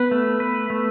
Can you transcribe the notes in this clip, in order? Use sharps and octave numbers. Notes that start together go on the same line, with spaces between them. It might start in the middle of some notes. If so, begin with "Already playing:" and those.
Already playing: B3 B4
A3
B4
A3